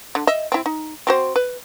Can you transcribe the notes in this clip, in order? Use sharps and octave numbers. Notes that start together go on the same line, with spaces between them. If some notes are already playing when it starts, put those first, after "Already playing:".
D3
D#5 E5
C4 E4
D#4
C4 F#4 C5
B4